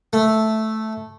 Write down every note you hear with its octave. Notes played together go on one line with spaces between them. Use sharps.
A3